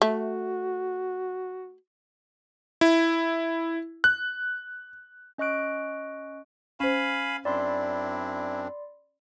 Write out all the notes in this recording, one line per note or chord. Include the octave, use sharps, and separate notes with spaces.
A3 F#4
E4
F#6
C#4 D#5 C#6 F#6 D7
C#4 C5 F5 G#5 B5
F#2 C4 D4 E4 D5 B5 C6